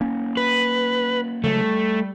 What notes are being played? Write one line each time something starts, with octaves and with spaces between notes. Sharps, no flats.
A#3 C#4
B4
C#3 F#3 G#3 A3
G3